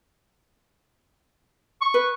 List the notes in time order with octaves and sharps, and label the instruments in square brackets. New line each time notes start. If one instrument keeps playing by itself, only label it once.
[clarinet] C#6
[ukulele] B4